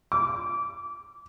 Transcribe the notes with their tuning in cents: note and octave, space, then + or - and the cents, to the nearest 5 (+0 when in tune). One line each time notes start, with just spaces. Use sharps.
D6 -25